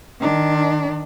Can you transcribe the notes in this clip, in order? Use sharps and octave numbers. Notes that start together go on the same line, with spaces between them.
D#3 D4